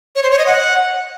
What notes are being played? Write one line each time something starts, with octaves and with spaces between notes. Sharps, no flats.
C#5
C5
C#5
D#5
F#5